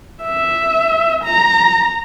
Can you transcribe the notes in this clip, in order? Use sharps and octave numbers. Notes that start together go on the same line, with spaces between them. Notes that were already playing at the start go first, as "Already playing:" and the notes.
E5
A#5